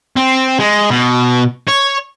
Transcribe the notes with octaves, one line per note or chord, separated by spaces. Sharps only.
C4
G#3
B2
C#5